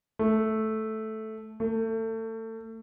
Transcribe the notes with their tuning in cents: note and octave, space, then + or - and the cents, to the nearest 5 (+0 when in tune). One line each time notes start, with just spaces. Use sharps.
A3 -5
A3 +30